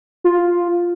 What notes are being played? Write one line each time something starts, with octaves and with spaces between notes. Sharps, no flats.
F4